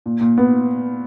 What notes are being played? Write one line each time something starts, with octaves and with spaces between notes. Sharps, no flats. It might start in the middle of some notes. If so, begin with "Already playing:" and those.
A#2
A#2
B3